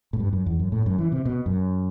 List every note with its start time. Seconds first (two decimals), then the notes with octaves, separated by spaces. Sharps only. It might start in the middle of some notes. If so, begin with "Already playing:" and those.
0.13 A2
0.20 G2
0.33 F#2
0.46 E2
0.59 F#2
0.72 A2
0.86 F#2
0.98 E3
1.12 C3
1.25 B2
1.46 F#2